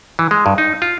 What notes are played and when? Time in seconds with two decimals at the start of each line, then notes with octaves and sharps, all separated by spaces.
0.19 E3
0.31 G#3
0.46 G2
0.58 D#4
0.82 F4